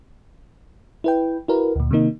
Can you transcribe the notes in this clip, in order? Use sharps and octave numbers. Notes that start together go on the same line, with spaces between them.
E4 B4 G5
E4 F#4 A#4 B4
D2 A#2
C3 D#3 A#3 D#4